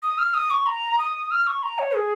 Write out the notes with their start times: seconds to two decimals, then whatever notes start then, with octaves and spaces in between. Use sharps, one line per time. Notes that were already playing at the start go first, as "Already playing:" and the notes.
0.03 D#6
0.18 F6
0.34 D#6
0.51 C#6
0.66 A#5
0.99 D#6
1.31 F6
1.47 C#6
1.63 A#5
1.79 C#5
1.95 G#4